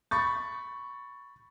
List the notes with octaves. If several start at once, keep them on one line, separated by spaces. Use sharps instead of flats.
B5 C#6 A6